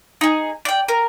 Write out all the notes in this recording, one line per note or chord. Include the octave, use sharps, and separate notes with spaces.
D#4 G#4
D5 G5
A#4